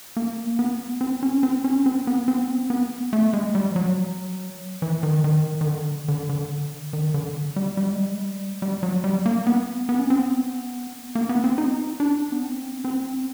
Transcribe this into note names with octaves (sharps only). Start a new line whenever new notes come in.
A#3
B3
C4
C#4
C4
C#4
C4
B3
C4
B3
C4
B3
A3
G#3
G3
F3
F#3
E3
D#3
D#3
D#3
D3
D3
D3
D#3
D3
G3
G3
G#3
G3
G#3
G3
G3
F#3
G3
A#3
B3
B3
C#4
C4
B3
A#3
B3
C4
D#4
D4
B3
C4
C4